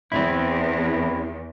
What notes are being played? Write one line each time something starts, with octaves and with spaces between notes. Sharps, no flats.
E2 C4 E4